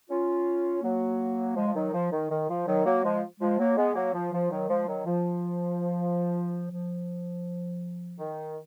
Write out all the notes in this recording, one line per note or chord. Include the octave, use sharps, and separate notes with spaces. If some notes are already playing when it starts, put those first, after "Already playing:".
C#4 F4
F#3 A#3
F3 G#3
F3
D#3 F#3
F3
D#3
D#3
F3
D#3 F#3
F#3 A#3
F3 G#3
F3 G#3
F#3 A#3
G#3 B3
F#3 A#3
F3
F3
D#3 F#3
F3 G#3
D#3 F#3
F3
F3
D#3